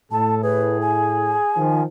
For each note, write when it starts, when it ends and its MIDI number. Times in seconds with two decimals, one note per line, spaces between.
0.12 1.36 45
0.12 0.42 69
0.12 0.35 81
0.43 1.75 68
0.43 0.78 71
0.81 1.83 80
1.57 1.84 51
1.57 1.84 53